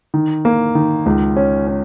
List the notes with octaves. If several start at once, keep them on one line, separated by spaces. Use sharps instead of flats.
D#3
A#3
D#3
C#2
C#4
C#4